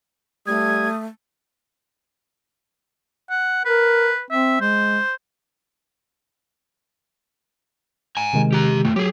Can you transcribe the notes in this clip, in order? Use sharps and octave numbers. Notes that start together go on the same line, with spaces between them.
G3 A3 D#6 G#6
F#5
A#4 B4
C4 E5
G#3 C5
G#5 A#5
C3 D#3 G#3
G4 A#5
A3 F4
F#3 G4 G#4